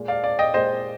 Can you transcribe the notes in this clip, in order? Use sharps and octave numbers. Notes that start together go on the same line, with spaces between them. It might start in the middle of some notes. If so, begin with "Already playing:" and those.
Already playing: A#2 G#3
D5 F5
D5 F5
D#5 G5
A#2 G#3 C5 D#5